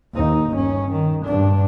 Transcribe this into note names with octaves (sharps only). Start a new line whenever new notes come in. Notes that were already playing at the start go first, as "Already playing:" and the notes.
D#2 D#4
G1 C#4
D#3
G2 D4